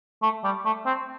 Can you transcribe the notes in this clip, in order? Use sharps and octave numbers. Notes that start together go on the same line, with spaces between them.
A3
G3
A3
C4